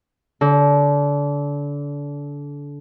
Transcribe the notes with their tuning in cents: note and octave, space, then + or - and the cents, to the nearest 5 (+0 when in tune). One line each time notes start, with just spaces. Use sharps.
D3 -30